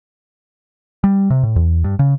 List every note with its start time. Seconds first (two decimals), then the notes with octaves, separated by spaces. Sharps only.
1.04 G3
1.30 C3
1.43 A2
1.56 E2
1.84 G2
1.99 C#3